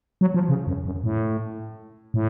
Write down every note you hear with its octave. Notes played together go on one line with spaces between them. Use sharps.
F#3
F3
C#3
F#2
F#2
A2
A2